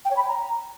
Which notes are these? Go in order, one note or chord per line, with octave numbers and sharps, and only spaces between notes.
G5
C#5
B5
G5
A#5